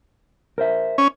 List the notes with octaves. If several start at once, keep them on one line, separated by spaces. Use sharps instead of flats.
A#4 C5 E5
C#4